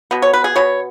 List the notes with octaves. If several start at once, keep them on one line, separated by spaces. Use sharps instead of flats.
B2 B3
C#5
B4
G#4
B2 B3 C#5